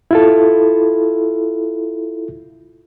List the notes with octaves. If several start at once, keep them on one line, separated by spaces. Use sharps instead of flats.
E4 F4 A4